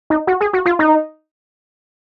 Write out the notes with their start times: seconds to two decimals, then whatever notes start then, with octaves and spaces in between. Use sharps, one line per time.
0.10 D#4
0.27 F#4
0.41 G#4
0.53 F#4
0.66 F4
0.79 D#4